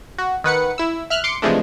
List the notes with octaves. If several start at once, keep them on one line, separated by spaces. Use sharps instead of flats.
F#4
D#3 B4 F#5 C#7
E4 E6
E5 F6 F#6
C6 D6 C#7
C3 E3 F3 G#3 A3 D4